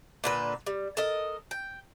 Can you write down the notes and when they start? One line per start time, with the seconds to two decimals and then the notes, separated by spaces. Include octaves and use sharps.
0.24 A#2 D3 B4
0.66 G3
0.97 A4 A#4 D#5
1.51 G5